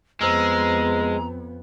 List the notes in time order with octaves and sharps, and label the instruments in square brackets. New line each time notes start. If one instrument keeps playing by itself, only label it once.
[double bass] F2 B3 [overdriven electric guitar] G#3 [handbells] C5 E6 F6 [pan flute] A#5